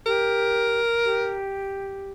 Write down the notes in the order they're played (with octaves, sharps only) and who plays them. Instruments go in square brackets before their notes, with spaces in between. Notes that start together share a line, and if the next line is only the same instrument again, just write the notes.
[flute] G4 [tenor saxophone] A#4
[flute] G4